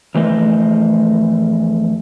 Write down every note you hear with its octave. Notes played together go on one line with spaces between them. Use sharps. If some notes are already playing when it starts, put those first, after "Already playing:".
F2 E3 A3 C5 D#5